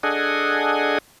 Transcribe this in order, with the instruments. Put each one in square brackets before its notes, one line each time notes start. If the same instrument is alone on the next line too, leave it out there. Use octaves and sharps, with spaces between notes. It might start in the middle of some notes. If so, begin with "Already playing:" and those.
[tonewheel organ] D4 G#4 A4 D#5 F#5 G#5